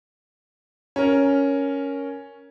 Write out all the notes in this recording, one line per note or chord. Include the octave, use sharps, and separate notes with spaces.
C#4 A#4